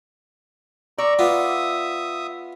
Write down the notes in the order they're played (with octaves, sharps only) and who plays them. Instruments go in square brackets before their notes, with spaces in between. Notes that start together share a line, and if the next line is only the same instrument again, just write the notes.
[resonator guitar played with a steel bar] D5 [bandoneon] A#5 C#6 E6
[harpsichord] B3 F4 [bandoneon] E5 D#6